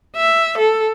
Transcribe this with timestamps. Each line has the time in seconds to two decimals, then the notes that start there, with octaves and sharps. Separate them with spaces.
0.17 E5
0.58 A4